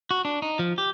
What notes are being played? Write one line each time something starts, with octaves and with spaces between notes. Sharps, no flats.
F#4
D4
D#4
F3
G4